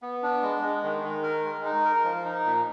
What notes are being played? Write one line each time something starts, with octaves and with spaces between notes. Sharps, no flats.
B3
D4
G#3
G#3
D#3
D#3
A#4
G#3
D#4
A#4
F3
D#4
A#2